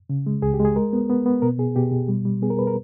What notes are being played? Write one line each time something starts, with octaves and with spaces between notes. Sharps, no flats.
C#3
G#3
C#2 G#4
G4
G#3
G#4
G#3 A#4
B3
B3
B3
B2 A#4
B2 G#4
B2 G4
B2
G3
G3
B3 G#4
A#4
B4
A#4